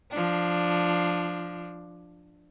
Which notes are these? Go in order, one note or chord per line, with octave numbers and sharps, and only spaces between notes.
F3 D4